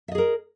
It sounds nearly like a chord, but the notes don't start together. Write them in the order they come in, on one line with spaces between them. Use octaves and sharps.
E5 D#5 G#4 A#4